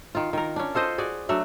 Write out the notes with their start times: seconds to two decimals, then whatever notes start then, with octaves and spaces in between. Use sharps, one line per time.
0.15 D#3 F4
0.33 D#3 A#4
0.56 C#4 D4
0.75 F4 A4 C5 D#5
0.98 F#4 G#4 D5
1.29 F#3 A3 D4 F#4